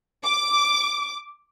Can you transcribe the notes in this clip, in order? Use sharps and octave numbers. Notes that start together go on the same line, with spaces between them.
D6